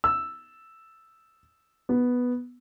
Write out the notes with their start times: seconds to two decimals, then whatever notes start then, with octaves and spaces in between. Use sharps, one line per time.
0.04 E6
1.89 B3